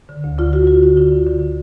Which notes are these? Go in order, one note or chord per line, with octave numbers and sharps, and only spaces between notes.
D3
D2
D3 F4
D3 F#4
D3 F#4
D3 F4
D3 F4
D3
D3